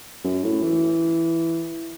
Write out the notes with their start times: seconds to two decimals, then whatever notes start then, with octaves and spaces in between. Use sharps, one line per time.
0.24 F#2
0.44 A2
0.63 E3